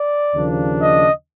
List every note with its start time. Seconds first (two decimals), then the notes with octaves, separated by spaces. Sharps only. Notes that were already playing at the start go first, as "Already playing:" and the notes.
Already playing: D5
0.35 D#2 C#3 F3 A#3 D4
0.80 D#5